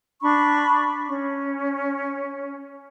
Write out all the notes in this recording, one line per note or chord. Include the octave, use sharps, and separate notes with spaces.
D4 B5 C#6
C#4